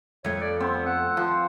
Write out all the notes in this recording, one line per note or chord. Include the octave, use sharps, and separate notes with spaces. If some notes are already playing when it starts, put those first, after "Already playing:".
F2 A3 C#5
D5
B3 C4
F#5
F3